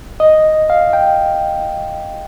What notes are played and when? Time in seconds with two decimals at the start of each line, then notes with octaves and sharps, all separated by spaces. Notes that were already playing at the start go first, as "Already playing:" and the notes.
0.20 D#5
0.70 F5
0.93 G5